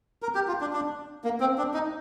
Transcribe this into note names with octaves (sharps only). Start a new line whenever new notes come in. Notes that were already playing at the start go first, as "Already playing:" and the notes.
A#4
G4
F4
D4
D4
A#3
C4
D4
D#4